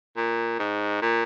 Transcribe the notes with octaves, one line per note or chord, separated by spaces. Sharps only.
A#2
G#2
A#2